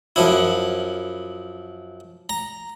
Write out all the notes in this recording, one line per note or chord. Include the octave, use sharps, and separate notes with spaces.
F#2 F3 E4
A#5